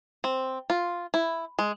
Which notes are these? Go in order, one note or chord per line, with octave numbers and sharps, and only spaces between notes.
C4
F4
E4
G#3